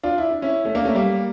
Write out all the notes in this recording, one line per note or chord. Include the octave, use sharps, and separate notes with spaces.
D4 F4
E4
D4
C#4 E4
A3 C#4
A#3 D4
A3 C#4
G3 A#3